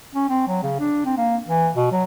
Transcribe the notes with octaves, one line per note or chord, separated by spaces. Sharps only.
C#4
C4
F#3
C#3
D4
C4
A#3
E3
B2
F#3